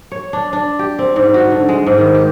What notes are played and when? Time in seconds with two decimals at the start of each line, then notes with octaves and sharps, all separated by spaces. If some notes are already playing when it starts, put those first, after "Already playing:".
0.12 C#5
0.33 D4
0.53 D4
0.79 G4
0.99 C4
1.16 G#2
1.34 F#4
1.52 D3
1.69 G#3
1.87 G#2
1.98 D#3
2.15 G4